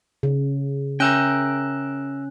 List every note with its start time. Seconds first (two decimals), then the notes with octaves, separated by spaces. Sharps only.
0.23 C#3
1.00 C#4 A#4 E5 G5 F#6